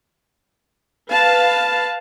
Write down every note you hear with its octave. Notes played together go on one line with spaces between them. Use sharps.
B4 F5 A5